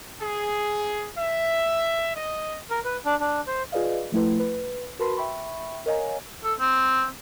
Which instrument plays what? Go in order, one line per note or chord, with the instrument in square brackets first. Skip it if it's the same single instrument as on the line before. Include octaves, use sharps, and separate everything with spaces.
[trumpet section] G#4
E5
D#5
[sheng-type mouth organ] A#4
B4
D4
D4
C5
[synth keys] F4 G#4 B4 D5 D#5 F5
F3 A3 E4 B4
B4
F#4 A#4 B4 A5 B5 C6
E5 G5 B5 C#6
A#4 C#5 D#5 F5 G#5 A#5
[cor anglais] A4
C4